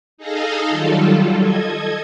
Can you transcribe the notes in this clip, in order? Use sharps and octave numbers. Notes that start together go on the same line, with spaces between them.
D#4 G#4 A4 D#5 F5
D#3 F#3 G3 F4 A4
A4 D#5 G#6